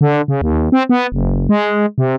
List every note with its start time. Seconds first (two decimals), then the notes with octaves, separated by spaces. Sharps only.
0.01 D3
0.28 C#3
0.42 D#2
0.72 C4
0.89 B3
1.12 F#1
1.49 G#3
1.98 C3